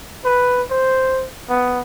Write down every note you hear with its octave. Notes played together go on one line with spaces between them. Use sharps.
B4
C5
B3